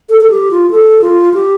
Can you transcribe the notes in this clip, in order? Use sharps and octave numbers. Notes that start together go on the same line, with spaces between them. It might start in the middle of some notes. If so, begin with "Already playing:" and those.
A4
A4
G4
F4
A4
F4
G4